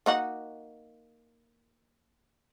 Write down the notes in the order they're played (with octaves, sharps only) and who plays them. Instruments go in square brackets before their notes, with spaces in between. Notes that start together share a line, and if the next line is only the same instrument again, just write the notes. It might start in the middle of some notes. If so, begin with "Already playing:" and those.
[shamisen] A#3 D#4 F#4